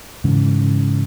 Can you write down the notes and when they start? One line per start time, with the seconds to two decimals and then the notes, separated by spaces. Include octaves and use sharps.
0.24 G#2 C#3 E3